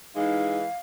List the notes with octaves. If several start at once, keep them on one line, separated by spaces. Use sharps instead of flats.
E3 G#3 D#4 F5